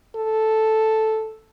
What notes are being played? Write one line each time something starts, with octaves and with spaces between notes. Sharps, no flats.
A4